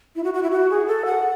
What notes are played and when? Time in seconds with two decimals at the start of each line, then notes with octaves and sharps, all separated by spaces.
0.16 E4
0.24 F#4
0.34 F#4
0.43 E4
0.51 F#4
0.70 G#4
0.87 A4
1.06 F#5